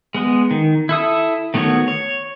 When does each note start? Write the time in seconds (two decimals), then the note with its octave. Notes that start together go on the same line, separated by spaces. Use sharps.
0.14 G#3 B3
0.51 D#3
0.89 E4 A4 D#6
1.54 D#3 A3 B3 F#4 C#5
1.88 C#5